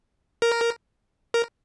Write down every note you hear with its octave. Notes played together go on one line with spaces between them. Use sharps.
A#4
A#4